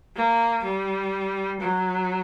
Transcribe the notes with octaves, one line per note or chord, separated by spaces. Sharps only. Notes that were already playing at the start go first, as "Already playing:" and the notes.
A#3
G3
F#3